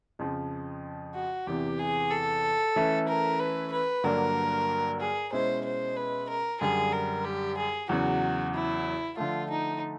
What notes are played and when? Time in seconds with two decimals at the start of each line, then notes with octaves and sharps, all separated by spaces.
0.19 F2 C#3 F3
1.15 F#4
1.47 E2 C3 E3 G4
1.79 G#4
2.11 A4
2.76 E3 A3 C#4 E4
3.08 A#4
3.39 B4
3.72 B4
4.04 G2 D3 F#3 A#3 D4 A#4
5.00 G#4
5.33 B2 G#3 C#4 E4 C5
5.65 C5
5.97 B4
6.29 A#4
6.61 F#2 D3 G3 G#4
6.93 A#4
7.25 G4
7.57 G#4
7.89 E2 C#3 F#3 F#4
8.54 E4
9.17 D3 F3 A3 F4
9.50 D#4